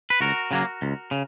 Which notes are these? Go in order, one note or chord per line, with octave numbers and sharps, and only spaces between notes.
B4
C#2 F#4 A#4
C#3 F#3 A#3
C#2
C#3